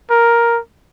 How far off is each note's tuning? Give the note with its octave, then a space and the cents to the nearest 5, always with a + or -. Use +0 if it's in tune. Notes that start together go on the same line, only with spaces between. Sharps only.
A#4 +5